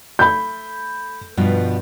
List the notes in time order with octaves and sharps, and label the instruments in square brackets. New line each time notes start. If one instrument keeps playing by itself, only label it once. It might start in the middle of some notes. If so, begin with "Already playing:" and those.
[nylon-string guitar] A3 [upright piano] B5 G6
[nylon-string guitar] G2 B2 F3